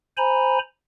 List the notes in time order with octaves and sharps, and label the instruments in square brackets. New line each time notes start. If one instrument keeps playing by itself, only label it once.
[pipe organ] C5 G#5 A#5 B5